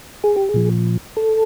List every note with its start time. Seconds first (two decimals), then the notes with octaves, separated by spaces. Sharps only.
0.24 G#4
0.36 G4
0.49 G#4
0.54 A#2 F3
1.17 A4